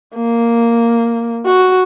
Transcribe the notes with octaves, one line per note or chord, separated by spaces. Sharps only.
A#3
F#4